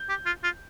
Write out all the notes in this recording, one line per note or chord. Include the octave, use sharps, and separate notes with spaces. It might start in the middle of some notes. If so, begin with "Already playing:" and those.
Already playing: G6
G4
F4
F4